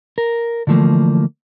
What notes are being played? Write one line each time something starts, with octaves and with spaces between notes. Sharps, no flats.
A#4
D3 E3 F3 A3 A#3